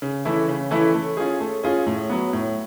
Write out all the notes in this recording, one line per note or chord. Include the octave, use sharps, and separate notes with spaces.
C#3
E3 A3 C#4 E4
C#3
E3 A3 C#4 E4
A3
C#4 F4 G#4
A3
C#4 F4 G#4
A2
F#3 B3
A2